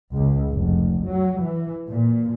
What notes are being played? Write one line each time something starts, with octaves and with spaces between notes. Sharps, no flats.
C#2
F1
F#3
E3
A#2